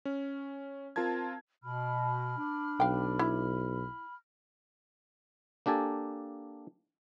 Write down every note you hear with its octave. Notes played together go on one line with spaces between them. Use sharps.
C#4
C4 F4 A#4 A5 G#6
B2 B5 F6
D4
B1 F5 G5
E4
A#3 D4 G4 A4 G#5